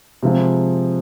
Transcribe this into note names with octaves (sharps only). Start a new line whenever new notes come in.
C3 F3 G#3